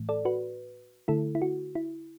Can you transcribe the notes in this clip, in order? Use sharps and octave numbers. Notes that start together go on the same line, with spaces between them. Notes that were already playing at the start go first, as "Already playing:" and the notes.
Already playing: A2 E3 A3
A4 D5
F#4 B4
D3 A3 E4 A4
E4
F#4
E4